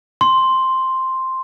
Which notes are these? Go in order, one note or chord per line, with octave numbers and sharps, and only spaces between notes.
C6